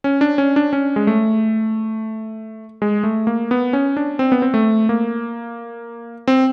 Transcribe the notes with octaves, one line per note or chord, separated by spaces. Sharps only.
C#4
D4
C#4
D4
C#4
G#3
A3
G#3
A3
A#3
B3
C#4
D4
C4
B3
C4
A3
A#3
C4